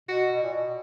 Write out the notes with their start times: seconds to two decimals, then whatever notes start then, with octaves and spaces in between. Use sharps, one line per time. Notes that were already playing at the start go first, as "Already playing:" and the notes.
0.09 B2 F#4
0.32 B2
0.43 A#2
0.53 B2